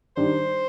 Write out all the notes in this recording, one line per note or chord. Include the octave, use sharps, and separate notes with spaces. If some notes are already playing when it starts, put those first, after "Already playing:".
D#3 G3 D4 C5